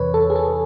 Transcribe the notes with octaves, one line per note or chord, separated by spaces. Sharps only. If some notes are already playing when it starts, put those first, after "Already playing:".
Already playing: E2 C3 E3 B4 C#5
A4
G#4
A4